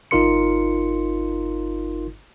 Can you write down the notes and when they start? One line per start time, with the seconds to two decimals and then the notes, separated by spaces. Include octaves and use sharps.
0.11 G1 D#4 F4 A#4 C6 C#7